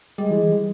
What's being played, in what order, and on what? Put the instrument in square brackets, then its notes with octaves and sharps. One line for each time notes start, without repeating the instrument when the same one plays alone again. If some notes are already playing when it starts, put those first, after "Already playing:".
[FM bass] G3 [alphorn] G#3
[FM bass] E3
G3